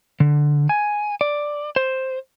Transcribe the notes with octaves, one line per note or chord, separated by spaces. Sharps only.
D3
G#5
D5
C5